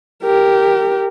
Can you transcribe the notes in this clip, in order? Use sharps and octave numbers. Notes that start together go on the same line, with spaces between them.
G4 A#4